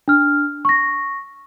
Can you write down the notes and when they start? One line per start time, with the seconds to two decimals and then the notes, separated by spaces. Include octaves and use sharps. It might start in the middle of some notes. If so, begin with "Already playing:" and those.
0.08 D4 F6
0.65 C#6 A#6